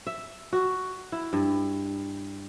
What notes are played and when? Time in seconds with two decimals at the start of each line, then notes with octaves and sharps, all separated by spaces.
0.07 E5
0.53 F#4
1.12 E4
1.33 G2